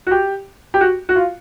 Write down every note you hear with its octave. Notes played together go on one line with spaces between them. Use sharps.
F#4
G4
G4
F#4
F#4
F4